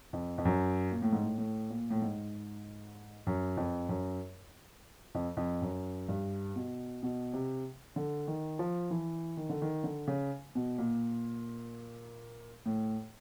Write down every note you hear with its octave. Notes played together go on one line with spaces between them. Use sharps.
F2
F2
F#2
A#2
A2
G#2
A2
A2
A#2
A2
G#2
F#2
F2
F#2
F2
F2
F#2
G2
B2
B2
C3
D3
D#3
F3
E3
D#3
D3
D#3
D3
C#3
B2
A#2
A2